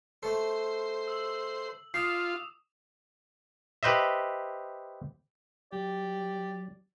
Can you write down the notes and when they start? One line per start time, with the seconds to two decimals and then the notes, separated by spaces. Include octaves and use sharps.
0.23 A3 A4 C5
1.08 E6 F#7
1.94 F4 G5 D6 D#6 C7 E7
3.83 G4 B4 C5 D#5 E5
5.73 F#3 G4 D5